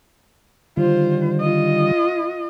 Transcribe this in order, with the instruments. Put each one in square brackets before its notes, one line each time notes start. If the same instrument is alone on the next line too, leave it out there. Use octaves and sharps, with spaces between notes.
[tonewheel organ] D3 D#3 G3 [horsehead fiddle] F4 C5
[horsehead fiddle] F4 D#5